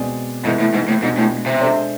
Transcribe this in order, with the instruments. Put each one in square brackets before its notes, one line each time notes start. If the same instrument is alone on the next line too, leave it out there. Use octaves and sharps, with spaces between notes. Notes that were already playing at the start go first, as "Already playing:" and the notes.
Already playing: [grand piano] B2 G#3 C4 G#4 D5
[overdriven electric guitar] G#2 [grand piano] C3 E3 B3 E4 A4
[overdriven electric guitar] A2
G#2
A2
[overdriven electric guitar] G#2 [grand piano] B2 G#3 D4 F4
[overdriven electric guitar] A2
C3
[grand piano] G#3 D4 A4 C5 E5